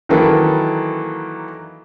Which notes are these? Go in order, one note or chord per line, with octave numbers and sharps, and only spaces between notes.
D#3 E3 F#3 A#3 A4 B4